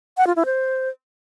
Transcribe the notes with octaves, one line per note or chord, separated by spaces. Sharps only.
F#5
F4
E4
C5